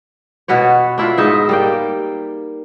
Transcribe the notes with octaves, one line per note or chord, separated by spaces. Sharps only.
B2 F#4 B4 C#5
D4 E4 F4
G#2 D#4 E5
G3 A#3 G5